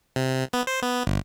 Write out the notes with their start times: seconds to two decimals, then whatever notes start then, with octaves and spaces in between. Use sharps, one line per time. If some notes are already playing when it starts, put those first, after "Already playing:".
0.16 C3
0.53 B3
0.67 C5
0.82 B3
1.07 G1